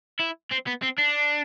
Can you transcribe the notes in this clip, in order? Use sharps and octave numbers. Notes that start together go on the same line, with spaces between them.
E4
C4
B3
C4
D4